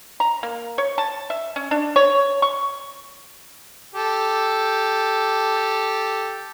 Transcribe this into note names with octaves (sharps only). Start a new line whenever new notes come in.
A#5
A#3
C#5
A5
E5
C#4
D4
C#5
C#6
G4 A4